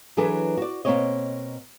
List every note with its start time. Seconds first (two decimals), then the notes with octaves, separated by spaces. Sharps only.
0.17 E3 F#3 D4 G#4 A4 B4
0.58 F#4 D5
0.85 B2 G#3 A#3 C4 C#5 D#5